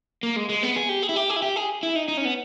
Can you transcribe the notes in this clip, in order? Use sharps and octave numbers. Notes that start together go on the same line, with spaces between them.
A#3
G#3
G#3
B3
G#4
G4
G#4
E4
G4
G#4
E4
G4
G#4
E4
D#4
D#4
C#4
B3